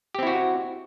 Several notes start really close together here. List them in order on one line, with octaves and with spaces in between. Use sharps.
G4 C4 E4 F#4